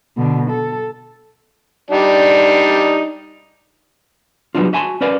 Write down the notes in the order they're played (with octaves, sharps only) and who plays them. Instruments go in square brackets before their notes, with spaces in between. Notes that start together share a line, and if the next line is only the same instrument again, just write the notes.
[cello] B2 D3
A4
[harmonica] G3 D4 D#4
[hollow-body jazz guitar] F#3 G3 B3 C#4 D4 F4
F#4 E5 G#5 A5 C6
C#4 A#4 B4 D5 F5 G#5